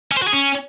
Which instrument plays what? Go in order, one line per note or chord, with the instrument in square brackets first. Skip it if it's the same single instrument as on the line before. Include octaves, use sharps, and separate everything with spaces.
[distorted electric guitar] C#4
C5
F#4
G#4
C#4